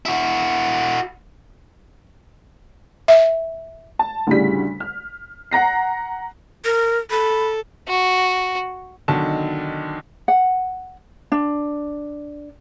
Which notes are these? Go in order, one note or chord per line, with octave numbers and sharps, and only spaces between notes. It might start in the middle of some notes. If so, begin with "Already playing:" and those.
E4 F#4
E5
A5
D2 A2 C#3 G3 B6
F6
F#5 A#5 A#6 C7
A#4
A4 B5
F#4
B1 D3 D#3 A5
F#5
D4